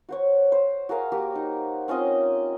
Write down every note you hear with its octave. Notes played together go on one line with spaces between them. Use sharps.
F#4 C5 C#5
C5
F#4 G#4 A#4 F5
A#3 F#4 G4
D#4
C4 C#4 F4 D#5